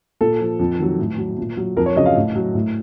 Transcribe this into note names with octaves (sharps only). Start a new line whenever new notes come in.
A#2 A4
F3
F2
D#3 F#3
A2
F#3
A#2
F#3
F2 A#4
C#5
C#3 F#3 D#5
F5
A2
F#3
A2